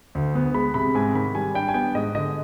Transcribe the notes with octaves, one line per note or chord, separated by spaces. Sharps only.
D2
B3
G#3 B5
C3 B5
G#2 G#5
D#3 B5
G3 G#5
D4 G5
G#5
B3 G5
G#2 D#5
D3 D#5